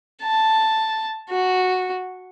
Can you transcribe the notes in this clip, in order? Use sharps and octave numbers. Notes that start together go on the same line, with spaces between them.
A5
F#4